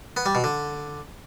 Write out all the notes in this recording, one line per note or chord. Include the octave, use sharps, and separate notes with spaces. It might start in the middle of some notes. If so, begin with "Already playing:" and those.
B3
G3
B2
D3